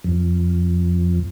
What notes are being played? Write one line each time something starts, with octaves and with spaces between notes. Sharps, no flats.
F2